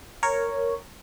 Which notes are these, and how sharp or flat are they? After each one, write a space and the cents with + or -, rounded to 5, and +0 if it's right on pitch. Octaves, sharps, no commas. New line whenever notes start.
A#4 -5 C#5 +0